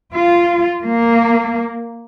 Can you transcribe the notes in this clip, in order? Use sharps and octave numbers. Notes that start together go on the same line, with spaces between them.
F4
A#3